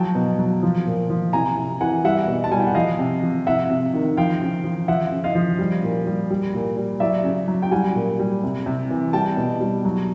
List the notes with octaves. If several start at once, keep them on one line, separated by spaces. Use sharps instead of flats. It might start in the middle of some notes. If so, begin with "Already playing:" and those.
Already playing: F3 F#3 G5 A5
B2
F#3
F3
A#2
F3
C3 G#5 A#5
C3
E3 F#5 G#5
G3 E5 F#5
B2
A5
G3 G#5
G5
F#5
F3 D#5 F5
C3
F3
C3 E5 F#5
C3
D#3
F3 F5 G5
C#3
F3
F3 E5 F#5
C#3
D#5 F5
F3
G3
A#2
G3
G3
A#2
G3
F#3 D5 E5
C#3
F#3
G5
G3 F#5 G#5
A#2
G3
C3
C3
E3
G3 G5 A5
B2
G3
F#3